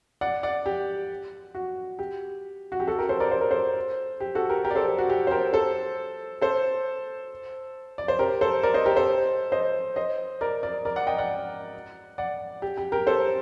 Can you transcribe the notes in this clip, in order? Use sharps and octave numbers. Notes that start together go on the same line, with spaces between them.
D5 F#5
D5 F#5
G4
F#4
G4
F#4
G4
F#4 A4
G4 A#4
A4 C5
A#4 D5
C5
A#4
A4 C5
G4
F#4 A4
G4 A#4
G4 A#4
D5
A4 C5
G4
F#4
G4
C5
G4 A#4
A4 C5
A4 C5
D5
C5
G4 A#4
A4 C5
A#4 D5
C5 D#5
G4 A#4
A4 C5
C5 D#5
C5 D#5
A#4 D5
A#4 D5
A#4 D5
D5 F#5
D#5 G5
D5 F#5
D5 F#5
G4
G4
G4 A#4
A4 C5